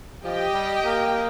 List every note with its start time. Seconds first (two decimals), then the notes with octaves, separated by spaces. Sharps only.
0.24 F3 G4 D#5 G5
0.53 G3
0.84 A#3